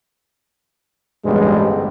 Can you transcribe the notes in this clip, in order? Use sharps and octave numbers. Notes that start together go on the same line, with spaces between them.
A1 D2 G2 B2 G3 G#3